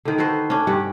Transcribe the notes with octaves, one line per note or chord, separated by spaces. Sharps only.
D3 D#3
F#4 A4 B4 C5
C#4 D4
G2 G4 F#5